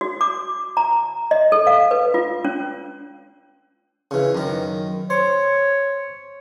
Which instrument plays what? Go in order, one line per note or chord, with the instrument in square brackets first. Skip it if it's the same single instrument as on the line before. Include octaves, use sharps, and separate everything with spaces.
[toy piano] F#4
D6
A#5
D#5
A4
F5
B4
F4
C#4
[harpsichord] C#3 E3
F#2 D#3
[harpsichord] C5 [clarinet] C#5